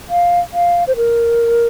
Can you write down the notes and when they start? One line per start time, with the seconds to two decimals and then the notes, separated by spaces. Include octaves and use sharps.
0.10 F5
0.53 F5
0.87 C5
0.96 A#4